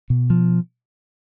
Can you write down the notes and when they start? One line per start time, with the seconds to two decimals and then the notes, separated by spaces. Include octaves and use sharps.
0.10 B2
0.30 F3